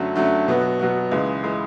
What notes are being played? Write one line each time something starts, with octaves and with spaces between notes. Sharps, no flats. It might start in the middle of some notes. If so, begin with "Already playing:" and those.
Already playing: F#2 D3 F#3 A3
F#2 D3 F#3 A3
B2 F#3 B3 F#4
B2 F#3 B3 F#4
C#2 C#3 E3 G#3
C#3 E3 G#3